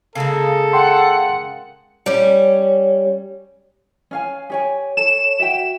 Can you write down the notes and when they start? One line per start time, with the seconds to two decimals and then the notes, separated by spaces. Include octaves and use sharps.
0.15 C#3 G#3 A#3 A4
0.73 F#5 G5 C6
2.06 G3 C#4
4.11 C#4 F5 G#5
4.50 G4 C#5 G#5
4.97 A4 C#5 E7
5.40 F#4 E5 G5